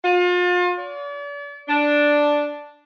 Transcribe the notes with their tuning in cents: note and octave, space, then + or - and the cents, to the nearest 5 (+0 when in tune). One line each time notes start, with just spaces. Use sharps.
F4 +35
D5 -40
D4 +0